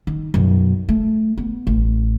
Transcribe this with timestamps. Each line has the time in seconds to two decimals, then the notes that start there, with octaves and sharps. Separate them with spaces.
0.07 D#3
0.34 B1 F#2
0.89 A3
1.38 B3
1.67 A1